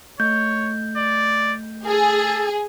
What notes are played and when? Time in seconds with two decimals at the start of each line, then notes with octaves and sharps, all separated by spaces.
0.20 A3 C#5 G6
0.97 D5
1.87 G#4 A4